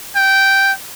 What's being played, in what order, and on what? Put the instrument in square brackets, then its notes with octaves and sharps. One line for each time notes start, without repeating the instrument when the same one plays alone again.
[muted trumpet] G5